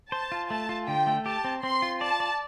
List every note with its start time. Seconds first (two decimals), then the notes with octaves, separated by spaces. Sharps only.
0.12 C5 A5
0.32 F4
0.50 A3 A5
0.69 F4
0.88 D3 G5
1.07 A3
1.26 G4 A5
1.44 C4
1.63 C4 C6
1.82 F4
2.01 D5 A5
2.20 D5